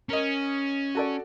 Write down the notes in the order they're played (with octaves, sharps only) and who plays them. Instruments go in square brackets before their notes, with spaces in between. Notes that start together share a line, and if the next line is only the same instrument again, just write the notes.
[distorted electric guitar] C#4 [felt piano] A#4 D#5
[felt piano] F#4 A4 D5